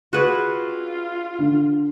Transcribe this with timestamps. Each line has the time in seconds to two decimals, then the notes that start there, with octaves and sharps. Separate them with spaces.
0.13 F4 F#4 G#4 B4 D5 G#6
1.39 D3